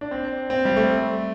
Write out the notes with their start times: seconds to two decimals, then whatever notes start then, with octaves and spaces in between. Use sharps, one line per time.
0.01 D4
0.11 C4
0.50 C4
0.65 G3
0.76 A3